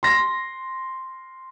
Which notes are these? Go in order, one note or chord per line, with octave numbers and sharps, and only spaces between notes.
C6 A#6